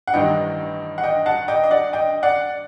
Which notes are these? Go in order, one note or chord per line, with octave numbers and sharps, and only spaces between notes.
F#5
A1 G2 D#3 D#5 G5
F#5
D#5 G5
F#5 A5
D#5 G5
D#5
D5 F#5
D#5 G5
D5 F#5